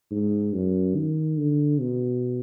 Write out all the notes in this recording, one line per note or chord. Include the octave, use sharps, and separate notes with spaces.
G#2
F#2
D#3
D3
B2